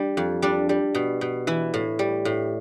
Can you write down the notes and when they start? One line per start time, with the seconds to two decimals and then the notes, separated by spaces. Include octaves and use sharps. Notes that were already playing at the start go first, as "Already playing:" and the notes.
Already playing: G3 D4
0.17 F2
0.42 G3 D4
0.69 G3
0.95 B2
1.21 B2
1.47 E3 E4
1.74 A2
1.99 G3
2.25 A2